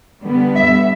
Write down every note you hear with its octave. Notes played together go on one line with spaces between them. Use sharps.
D3 G3 B3
E5